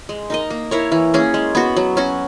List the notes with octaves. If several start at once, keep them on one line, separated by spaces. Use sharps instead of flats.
G#3
D#4 A#4 D#5
A#3
E4 A#4 C#5
E3
A#3 C#4 G#4
G#3
B3 F#4
F#3
C#4 F#4